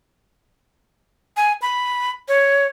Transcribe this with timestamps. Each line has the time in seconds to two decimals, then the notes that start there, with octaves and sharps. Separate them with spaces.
1.37 G#5
1.62 B5
2.28 C#5